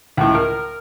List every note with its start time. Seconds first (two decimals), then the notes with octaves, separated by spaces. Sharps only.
0.17 C#2 A2
0.35 A#4